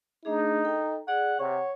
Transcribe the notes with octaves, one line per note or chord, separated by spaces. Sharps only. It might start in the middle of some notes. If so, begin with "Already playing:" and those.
A3 D4 D#4 G#4
A4 G5
G#4 D5 F#5
C3 C#5 F#5